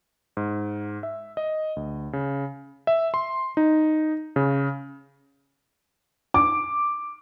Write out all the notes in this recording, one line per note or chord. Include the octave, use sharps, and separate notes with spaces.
G#2
E5
D#5
D2
C#3
E5
C6
D#4
C#3
D6